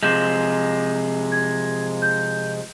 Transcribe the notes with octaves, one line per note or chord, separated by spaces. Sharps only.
C3 F3 G#3 G6 E7
G#6
G6